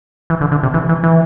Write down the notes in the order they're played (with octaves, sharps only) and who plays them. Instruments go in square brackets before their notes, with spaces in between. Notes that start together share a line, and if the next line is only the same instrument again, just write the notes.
[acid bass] E3
D3
D3
C3
E3
E3
E3